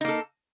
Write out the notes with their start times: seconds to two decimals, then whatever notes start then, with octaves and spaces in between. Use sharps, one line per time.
0.01 D#4
0.05 A#3
0.08 A4